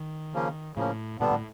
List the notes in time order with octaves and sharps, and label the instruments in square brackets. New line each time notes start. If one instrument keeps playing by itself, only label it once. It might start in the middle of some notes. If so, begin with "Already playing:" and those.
Already playing: [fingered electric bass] D#3
[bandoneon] C#3 F3 A#3 C#4
[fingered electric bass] A2 [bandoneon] C#3 F3 A#3 C#4
[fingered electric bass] A#2 [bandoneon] D3 G3 B3 D4
[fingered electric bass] A2